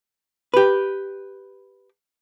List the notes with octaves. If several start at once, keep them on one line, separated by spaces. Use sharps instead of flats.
G4 B4